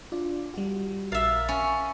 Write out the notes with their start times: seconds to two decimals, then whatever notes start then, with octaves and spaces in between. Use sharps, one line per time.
0.12 D4 F4 D5
0.54 G3 F#4
1.12 A#1 A#4 E5 F5 A6
1.49 C#4 B5